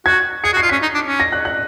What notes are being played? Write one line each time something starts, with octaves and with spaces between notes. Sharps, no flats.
F#4 G#6
G#4 C#7
F#4
C7
F4
C#4 B6
D#4
D4
C#4
A#6
F#6
F#6